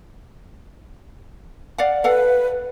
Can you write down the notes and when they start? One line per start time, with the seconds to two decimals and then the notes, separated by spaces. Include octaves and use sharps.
1.78 D5 F5 F#5
2.04 A4 B4 F5 F#5